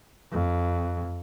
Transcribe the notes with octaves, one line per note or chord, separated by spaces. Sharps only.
F2